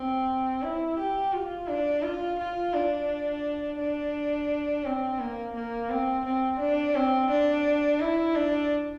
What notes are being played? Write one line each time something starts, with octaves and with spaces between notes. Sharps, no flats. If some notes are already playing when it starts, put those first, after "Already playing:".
Already playing: C4
E4
G4
F4
D4
F4
F4
D4
D4
C4
A#3
A#3
C4
C4
D4
C4
D4
E4
D4